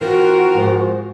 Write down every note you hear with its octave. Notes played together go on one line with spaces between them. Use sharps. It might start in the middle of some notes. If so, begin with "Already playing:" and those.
E3 C4 F4 F#4 A#4
G#2 F3 C5